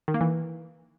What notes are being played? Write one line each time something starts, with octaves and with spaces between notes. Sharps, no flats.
D#3
A#3
E3